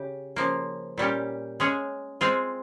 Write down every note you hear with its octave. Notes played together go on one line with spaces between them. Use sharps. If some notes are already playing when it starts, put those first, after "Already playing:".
Already playing: C#3 G4
C#3 F3 A#3
A#2 G3 C#4 G4
G#3 C#4 G#4
G#3 C4 F4 G#4